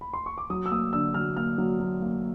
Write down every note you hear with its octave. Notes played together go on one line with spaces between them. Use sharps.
B5
C6
C#6
D6
F#3 D#6
E6
A#3 D#6
D3 E6
F#3 F6
A#3 F6
F#3
F#3
A#3